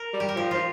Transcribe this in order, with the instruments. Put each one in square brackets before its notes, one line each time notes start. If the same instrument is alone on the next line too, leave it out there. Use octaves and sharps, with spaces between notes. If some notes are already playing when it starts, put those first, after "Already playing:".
Already playing: [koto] A#4
[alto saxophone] G3
[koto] G4
A#4
[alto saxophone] F3 [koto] G4
[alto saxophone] F3 [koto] F4